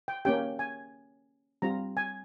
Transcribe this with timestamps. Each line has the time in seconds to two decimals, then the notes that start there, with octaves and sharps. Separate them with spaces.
0.08 G5
0.25 A#3 C#4 G4 G5
0.59 G#5
1.62 G3 C4 F4 A#5
1.97 G#5